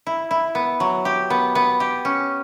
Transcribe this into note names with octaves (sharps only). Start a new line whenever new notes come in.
E4
E4
B3
F#3
G4
B3
B3
G4
C#4